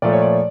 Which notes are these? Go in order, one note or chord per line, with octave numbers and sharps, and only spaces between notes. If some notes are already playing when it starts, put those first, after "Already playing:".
A#2 F3 A3 D5
C#5
D5